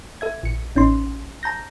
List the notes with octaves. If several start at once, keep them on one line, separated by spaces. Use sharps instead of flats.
A4 E5 G#6
A#1 C#7
A1 C#4 D#4 C6
A5 A#5 G6 A#6